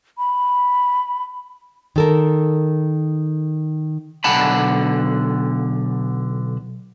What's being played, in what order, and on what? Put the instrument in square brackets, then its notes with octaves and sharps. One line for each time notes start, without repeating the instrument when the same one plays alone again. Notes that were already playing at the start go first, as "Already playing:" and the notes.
[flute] B5
[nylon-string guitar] D#3 A4 A#4
[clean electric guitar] B1 D3 F#5 A5 B5